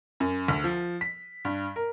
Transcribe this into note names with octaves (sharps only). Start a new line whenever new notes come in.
F#2
D2
F3
B6
G2
A#4